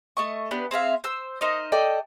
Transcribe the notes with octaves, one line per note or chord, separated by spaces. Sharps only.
A3 D#5 C#6
B3 D4 G4 B4
C4 G#4 E5 F5
C5 E6
D#4 A#4 C5 D#5
A4 D5 D#5 G5